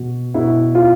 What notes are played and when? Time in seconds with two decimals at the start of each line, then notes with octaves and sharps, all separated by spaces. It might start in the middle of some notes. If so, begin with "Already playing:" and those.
Already playing: B2
0.34 B2 E4
0.75 F4